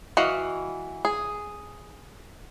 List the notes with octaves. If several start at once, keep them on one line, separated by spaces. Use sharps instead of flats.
E3 F#4 D#5 F5
G#4